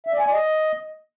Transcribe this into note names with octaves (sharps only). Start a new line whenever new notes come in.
E5
D5
G#5
D5
D#5